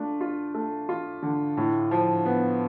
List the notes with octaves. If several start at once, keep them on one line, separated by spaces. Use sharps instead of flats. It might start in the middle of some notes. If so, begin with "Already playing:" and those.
Already playing: A3 D4 F4
F4
A3
F4
D3
A2
F3
B3